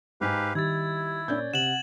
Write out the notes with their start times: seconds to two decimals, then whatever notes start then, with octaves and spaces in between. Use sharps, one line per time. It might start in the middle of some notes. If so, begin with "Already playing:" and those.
0.21 G#2 D#4 G4 B4 F5 G#5
0.55 D#3 G3 E4 G#6 A6
1.28 A#2 C#4 D5 G6
1.54 C3 F#5 E7 F#7